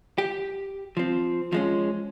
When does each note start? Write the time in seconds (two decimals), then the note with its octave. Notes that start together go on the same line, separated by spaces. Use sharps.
0.18 G4
0.97 F3 C4
1.53 F3 G#3 C#4